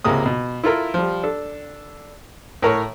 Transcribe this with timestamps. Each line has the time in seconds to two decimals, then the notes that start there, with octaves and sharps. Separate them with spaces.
0.04 C#2 C3 G#3 A#3 D#6
0.26 B2
0.64 E4 F4 A4 A#4 E5
0.94 F3 G3
1.23 D4 A4
2.62 A2 A#4 C#5